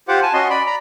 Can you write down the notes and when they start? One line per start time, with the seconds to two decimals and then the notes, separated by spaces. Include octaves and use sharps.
0.08 F4 G4 C5 F#5 D6
0.22 G#5 A5
0.33 C#4 F#4 D#5 C6
0.50 D5 B5
0.66 A#5 B5